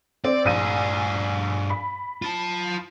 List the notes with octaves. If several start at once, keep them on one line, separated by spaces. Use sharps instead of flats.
C4 D5
A#1 G2 G#4 D#7
B5
F4 A5